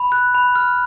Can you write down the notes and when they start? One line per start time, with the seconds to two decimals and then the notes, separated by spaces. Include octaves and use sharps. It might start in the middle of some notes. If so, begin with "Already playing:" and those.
Already playing: B5
0.12 F#6
0.35 B5
0.56 F6